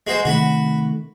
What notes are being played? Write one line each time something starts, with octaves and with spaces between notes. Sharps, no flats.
G#3 F#4 C5
C3 D#3 A3 F#4 B5